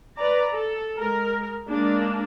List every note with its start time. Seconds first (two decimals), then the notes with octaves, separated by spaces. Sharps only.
0.17 B4 D5 A#5
0.50 A4
0.98 G#3 A#4
1.68 G#3 A#3 D4